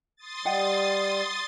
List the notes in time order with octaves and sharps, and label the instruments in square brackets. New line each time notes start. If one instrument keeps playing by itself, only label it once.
[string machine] C6 D#6 A6
[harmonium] G3 [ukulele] D#5 F#5 G5